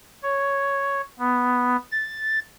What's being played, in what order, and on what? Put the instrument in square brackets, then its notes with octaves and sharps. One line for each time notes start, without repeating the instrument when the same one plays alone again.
[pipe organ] C#5
B3
A6